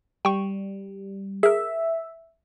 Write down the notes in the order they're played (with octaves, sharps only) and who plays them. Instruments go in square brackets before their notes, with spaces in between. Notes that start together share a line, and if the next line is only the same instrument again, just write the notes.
[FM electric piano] G3 [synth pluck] G5 C#6
[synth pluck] G#4 A#4 [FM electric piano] E5